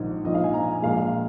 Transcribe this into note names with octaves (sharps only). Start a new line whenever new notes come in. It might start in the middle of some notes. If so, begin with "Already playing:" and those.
Already playing: A#1 G#2 D#3 D#5
A#1 G#2 F3 D#5
F5
G#5
A#5
G#5
G#5
A#1 A#2 G#3 F5